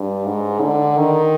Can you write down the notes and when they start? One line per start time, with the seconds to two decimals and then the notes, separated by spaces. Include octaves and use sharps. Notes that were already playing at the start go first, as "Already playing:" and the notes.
Already playing: G2
0.26 G#2
0.62 D3
0.98 D#3